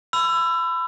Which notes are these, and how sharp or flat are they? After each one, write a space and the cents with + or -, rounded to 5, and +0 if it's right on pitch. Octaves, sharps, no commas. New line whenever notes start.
B5 +30 E6 +25